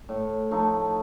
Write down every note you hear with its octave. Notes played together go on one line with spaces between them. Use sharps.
A2
F3 A3 D#4